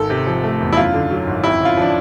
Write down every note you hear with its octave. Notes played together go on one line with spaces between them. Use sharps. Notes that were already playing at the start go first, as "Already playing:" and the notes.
Already playing: G#1 A4
C3
F3
A3
E2
E4
F#2 F4
D3
F#3
G#1
F2 E4
C#3
F4
F3 D4